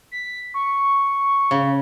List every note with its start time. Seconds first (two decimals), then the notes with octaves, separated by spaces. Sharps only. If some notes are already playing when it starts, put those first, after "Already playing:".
0.12 B6
0.54 C#6
1.51 C#3